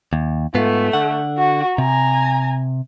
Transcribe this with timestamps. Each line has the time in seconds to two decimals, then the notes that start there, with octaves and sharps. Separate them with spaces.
0.13 D#2
0.55 G#2 A3 B3 F4
0.93 D3 F#5
1.38 F#4
1.78 C3 G#5 A#5